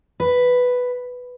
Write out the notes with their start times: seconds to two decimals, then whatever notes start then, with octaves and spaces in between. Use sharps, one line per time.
0.20 B4